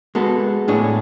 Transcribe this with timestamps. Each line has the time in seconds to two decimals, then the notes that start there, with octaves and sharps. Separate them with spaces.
0.15 G#3 B3 F#4 A4
0.68 A2 G#3 D4 G#4 C#5